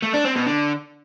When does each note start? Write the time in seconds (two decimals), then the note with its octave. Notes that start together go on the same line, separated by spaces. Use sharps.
0.03 A3
0.14 D4
0.25 C4
0.36 B2
0.47 D3